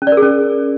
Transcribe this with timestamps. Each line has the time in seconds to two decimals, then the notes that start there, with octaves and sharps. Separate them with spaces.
0.02 C#4
0.07 D5
0.12 A#4
0.17 G#4
0.22 C#4